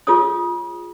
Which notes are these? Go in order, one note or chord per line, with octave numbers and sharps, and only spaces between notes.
F4 G#4 C#5 D#6